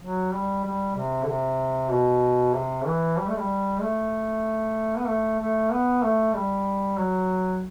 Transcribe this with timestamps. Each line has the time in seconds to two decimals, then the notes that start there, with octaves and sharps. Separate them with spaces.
0.01 F#3
0.32 G3
0.65 G3
0.96 C3
1.23 D3
1.28 C3
1.91 B2
2.54 C3
2.86 E3
3.18 G3
3.28 A3
3.38 G3
3.81 A3
4.97 B3
5.08 A3
5.39 A3
5.71 B3
6.03 A3
6.35 G3
6.98 F#3